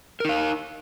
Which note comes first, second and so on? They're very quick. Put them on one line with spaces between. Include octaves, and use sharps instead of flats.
A#4 D#4 F5